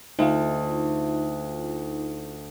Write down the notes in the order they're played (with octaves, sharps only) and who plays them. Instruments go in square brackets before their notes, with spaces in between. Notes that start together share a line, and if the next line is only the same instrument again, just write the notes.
[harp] D2 [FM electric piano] D#4 F4